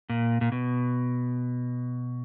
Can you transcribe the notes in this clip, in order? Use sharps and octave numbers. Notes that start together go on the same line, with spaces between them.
A#2
A#2
B2